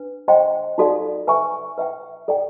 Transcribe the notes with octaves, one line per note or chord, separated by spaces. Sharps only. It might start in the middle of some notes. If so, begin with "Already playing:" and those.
Already playing: D4 B4
C5 D#5 G5 C6
D#4 F#4 A4 D5 F5
B4 E5 G#5 C#6
B4 E5 G5
A4 D5 G5